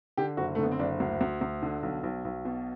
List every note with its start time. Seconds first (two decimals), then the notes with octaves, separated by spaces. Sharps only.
0.17 D3 G4
0.37 F#1 F#4
0.55 A3
0.58 D3 B3
0.71 C4
0.79 F#1 D4
1.00 D2
1.21 D2
1.41 D2
1.62 D3
1.83 B1
2.03 B1
2.25 B1
2.45 B2